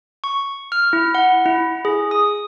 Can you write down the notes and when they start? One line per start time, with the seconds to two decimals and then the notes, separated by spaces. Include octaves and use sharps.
0.24 C#6
0.72 F6
0.93 E4
1.15 F#5
1.46 E4
1.85 G#4
2.11 D#6